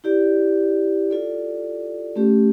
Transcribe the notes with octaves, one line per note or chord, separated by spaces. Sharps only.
E4 G4 D5
F4 A4 D5
A3 C#4 G4